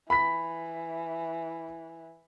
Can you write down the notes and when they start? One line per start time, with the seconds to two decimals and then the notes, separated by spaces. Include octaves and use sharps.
0.10 E3 B5 B6